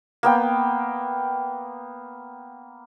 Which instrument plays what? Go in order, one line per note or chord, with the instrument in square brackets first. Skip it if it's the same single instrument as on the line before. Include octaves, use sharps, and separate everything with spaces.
[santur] A#3 B3 G5